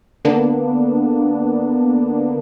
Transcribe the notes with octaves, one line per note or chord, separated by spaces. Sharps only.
D3 A#3 B3 D4